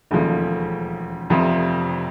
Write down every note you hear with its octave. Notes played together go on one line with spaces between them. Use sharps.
E1 D#2 C#3 F3 A3
F1 F2 C3 F3